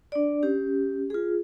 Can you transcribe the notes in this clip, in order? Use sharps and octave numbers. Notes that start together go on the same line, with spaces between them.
D4 D5
C#4 G4
F4 G#4